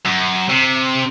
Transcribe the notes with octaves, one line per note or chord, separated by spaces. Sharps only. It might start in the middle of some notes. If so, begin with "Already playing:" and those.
F#2
C3